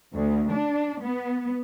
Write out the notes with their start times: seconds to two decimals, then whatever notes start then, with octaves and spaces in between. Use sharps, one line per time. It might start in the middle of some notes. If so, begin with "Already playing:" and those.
0.14 D2
0.52 D4
1.02 B3